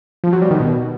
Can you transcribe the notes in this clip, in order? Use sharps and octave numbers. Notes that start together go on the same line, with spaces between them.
F3
F#3
G3
D#3
B2